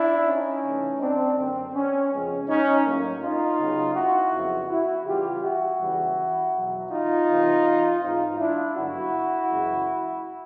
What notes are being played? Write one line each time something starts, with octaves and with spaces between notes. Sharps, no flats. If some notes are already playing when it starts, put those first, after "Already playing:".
Already playing: D4 E4
C#4 D#4
C3 E3 A3
C4 D4
F#2 D3 F#3 A#3 C4
C#4
F2 C#3 F3 G#3 B3 C#4
C#4 D#4
A2 F#3 A#3
D#4 F4
C#3 F#3 B3
E4 F#4
F2 C#3 F#3 B3
E4 F#4
C#3 E3 G3 F4 G4
E4 F#4
E2 C#3 E3 G3
E2 B2 F#3
D#4 F4
E2 C3 E3
G#2 E3 G#3 C4 D#4 F4
D4 E4
G2 D3 F#3 B3 E4 F#4
F#2 C#3 E3 G#3